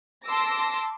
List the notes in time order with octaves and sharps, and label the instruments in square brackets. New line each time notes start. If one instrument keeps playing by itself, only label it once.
[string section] A5 C6 D6 E6 A#6